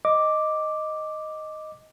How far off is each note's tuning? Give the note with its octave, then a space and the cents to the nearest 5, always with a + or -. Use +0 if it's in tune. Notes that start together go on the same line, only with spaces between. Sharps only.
D#5 +0 D6 +0